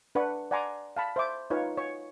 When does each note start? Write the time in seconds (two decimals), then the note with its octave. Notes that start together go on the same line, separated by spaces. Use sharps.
0.15 D4 B4 D5 F#5 C#6
0.51 D5 F#5 G#5 A#5 C6 D6
0.97 F5 A5 B5
1.16 C5 E5 D6
1.50 D#4 F4 B4 C#5 F5
1.78 C#5 C#6